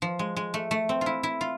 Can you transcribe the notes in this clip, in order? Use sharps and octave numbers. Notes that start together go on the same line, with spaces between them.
F3
G#3
G#3
A3
A3
C4
F4
E4
E4
F4